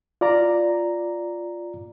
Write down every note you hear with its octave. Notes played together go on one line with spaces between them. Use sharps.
F4 D5 A#5